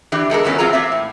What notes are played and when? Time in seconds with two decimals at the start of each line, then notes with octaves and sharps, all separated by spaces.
0.12 E3 D4 G4
0.30 E2 G#3 A4 A#4
0.44 F#2 F3 F#3 B3 C#4
0.58 E3 F#3 C4 F4 G#4 A#5
0.73 A#3 C4 E5
0.92 A2